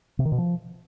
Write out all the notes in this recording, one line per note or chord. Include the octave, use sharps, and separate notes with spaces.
C3
D#3
B2
F3